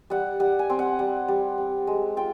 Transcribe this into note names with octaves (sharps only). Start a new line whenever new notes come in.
G3 F#5
G3 F#5
G#5
C4
F#5
G3
G3
C4
G#3
F4 G5